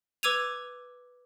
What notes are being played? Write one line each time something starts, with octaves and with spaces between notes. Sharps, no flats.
B4 D6 E6 G#6 D#7 F7